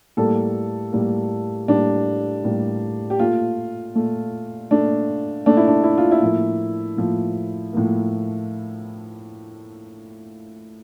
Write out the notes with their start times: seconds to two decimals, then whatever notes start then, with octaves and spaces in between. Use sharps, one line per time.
0.17 A2 G3 A#3 A4
0.92 A2 G3 A#3
1.68 A2 G3 A#3 D4
2.44 A2 G3 A#3
3.10 G4
3.19 A#2 A3 F4
3.95 A#2 A3
4.71 A#2 A3 D4
5.46 A#2 A3 D4
5.57 E4
5.68 D4
5.83 E4
5.98 F4
6.11 E4
6.22 A2 F3 A#3
6.97 A2 F3 A#3
7.73 A2 F3 A#3